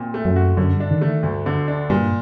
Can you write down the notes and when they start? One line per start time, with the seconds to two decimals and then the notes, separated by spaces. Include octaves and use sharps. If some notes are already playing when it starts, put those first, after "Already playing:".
Already playing: A#2 C4
0.14 A3
0.25 F#2
0.36 F#4
0.57 F#2 D3
0.74 G2
0.80 D4
0.91 D#3
1.01 D3 A3
1.07 D#3
1.23 D2 G2
1.46 D3
1.68 D4
1.90 G2 A#2